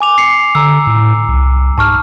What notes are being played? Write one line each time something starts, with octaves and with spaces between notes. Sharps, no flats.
G#5 D6 F7
C7 C#7
D3 A#5 E6
A2
C2
G#2 A5 C#6 F6